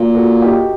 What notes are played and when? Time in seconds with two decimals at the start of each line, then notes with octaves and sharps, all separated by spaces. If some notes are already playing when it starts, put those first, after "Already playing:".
Already playing: A#2 F#4
0.15 F#4 A4
0.42 D#4 G4